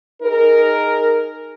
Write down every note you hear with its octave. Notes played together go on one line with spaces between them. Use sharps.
D#4 G#4 A#4